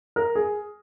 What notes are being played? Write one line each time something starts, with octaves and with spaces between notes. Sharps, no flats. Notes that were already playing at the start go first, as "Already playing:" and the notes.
A#4
G#4